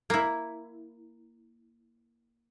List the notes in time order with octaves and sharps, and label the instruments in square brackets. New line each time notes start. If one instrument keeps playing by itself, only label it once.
[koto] A#3 E4